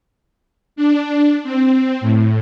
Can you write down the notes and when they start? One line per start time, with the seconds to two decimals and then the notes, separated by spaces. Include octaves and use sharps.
0.76 D4
1.44 C4
2.01 A2